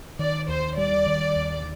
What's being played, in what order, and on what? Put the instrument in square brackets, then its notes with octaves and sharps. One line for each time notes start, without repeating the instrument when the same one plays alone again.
[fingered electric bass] D#3 [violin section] D5
[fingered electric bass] D#2 [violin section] C5
[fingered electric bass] G3 [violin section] D5
[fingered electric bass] D#3
D#2